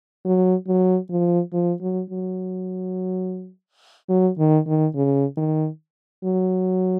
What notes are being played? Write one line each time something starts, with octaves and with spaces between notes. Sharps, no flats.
F#3
F#3
F3
F3
F#3
F#3
F#3
D#3
D#3
C#3
D#3
F#3